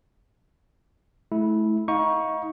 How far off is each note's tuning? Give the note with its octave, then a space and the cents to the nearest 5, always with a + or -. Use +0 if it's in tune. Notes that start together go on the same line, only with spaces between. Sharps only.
A3 -30 E4 -15
D#4 +35 F5 +40 C#6 +0